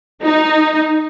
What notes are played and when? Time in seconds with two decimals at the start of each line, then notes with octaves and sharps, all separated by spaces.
0.22 D#4